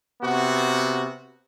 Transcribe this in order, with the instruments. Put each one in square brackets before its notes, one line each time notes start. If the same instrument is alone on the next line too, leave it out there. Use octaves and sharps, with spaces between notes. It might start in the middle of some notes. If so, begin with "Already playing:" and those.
[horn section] C3 B3 F#4